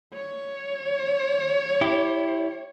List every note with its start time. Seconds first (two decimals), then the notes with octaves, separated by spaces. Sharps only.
0.14 C#5
1.81 E4 G4